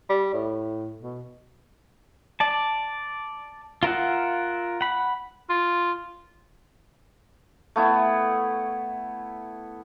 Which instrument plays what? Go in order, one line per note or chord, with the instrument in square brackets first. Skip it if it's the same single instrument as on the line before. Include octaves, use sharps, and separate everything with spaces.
[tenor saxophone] G3
A2
B2
[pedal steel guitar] D5 A5
F4 A#4 E5 F#5
F#5 B5
[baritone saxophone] F4
[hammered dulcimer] A3 B3 E4